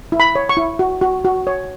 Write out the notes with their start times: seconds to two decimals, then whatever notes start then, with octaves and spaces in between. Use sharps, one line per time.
0.12 E4
0.20 B5
0.35 C#5
0.49 C#6
0.57 E4
0.79 F#4
1.01 F#4
1.25 F#4
1.47 C#5